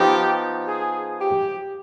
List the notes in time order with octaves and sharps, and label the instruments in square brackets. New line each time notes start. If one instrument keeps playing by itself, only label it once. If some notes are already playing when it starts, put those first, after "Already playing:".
Already playing: [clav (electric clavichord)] F3 B3 D#4 [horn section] G4
[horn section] G#4
G4